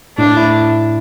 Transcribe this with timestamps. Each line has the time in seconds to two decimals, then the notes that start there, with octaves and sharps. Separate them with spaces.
0.18 A2 D4
0.37 E4